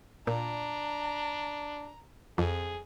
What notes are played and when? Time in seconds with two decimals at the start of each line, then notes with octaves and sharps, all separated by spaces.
0.27 A#2 D4 A#5
2.38 F2 G#4